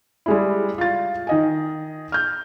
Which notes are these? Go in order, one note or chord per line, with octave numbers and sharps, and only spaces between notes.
G3 G#3 E4
F4 A6
D#3 D#5 G#5
F6 G6